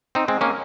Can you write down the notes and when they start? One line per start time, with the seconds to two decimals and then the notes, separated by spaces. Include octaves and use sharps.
0.15 C4 D#4
0.28 G#3 C4
0.41 A#3 C#4